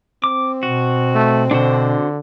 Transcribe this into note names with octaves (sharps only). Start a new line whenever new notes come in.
C4 D6
B2 F#4
A3
B2 D3 D4 F#4 C5